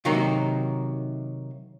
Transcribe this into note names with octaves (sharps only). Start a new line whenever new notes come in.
C3 D#3 F#3 A#3 D#4 F#4